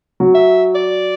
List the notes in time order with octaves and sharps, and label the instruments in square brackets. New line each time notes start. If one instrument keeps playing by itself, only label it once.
[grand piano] F#3
[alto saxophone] E5
D5